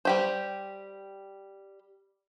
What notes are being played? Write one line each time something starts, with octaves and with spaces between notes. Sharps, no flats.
G3 G4 C5